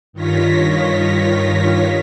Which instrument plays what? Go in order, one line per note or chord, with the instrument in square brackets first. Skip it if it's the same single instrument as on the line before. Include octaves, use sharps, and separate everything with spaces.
[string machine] G2 D#3 F4 C#5 A#6 B6